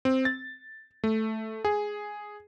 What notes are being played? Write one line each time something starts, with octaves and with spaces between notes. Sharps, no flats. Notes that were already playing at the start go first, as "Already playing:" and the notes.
C4
A6
A3
G#4